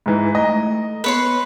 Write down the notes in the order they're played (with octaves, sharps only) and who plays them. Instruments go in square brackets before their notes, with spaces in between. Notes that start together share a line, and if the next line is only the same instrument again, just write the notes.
[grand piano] G#2 E3 [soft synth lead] G#3
[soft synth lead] A3 [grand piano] D#5 A#5
[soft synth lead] B3 [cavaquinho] B4 C#5 C6